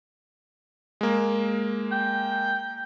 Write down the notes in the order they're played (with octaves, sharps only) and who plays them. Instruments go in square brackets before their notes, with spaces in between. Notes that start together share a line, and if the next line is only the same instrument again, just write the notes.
[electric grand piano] G#3 A#3
[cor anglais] G5